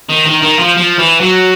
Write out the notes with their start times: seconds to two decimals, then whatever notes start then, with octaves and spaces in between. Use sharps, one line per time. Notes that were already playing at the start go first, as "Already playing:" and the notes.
0.10 D#3
0.26 D#3
0.43 D#3
0.60 F3
0.77 F3
0.99 E3
1.21 F#3